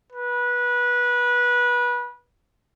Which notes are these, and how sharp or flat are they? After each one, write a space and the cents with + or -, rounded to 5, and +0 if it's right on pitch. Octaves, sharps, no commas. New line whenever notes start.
B4 -20